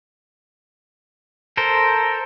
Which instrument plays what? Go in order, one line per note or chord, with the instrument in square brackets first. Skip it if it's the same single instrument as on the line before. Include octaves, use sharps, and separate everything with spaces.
[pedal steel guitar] A4 A#4 C5